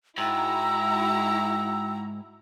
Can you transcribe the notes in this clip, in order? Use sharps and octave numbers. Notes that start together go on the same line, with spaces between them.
G#2 E4 F#4 G5 A#5 E6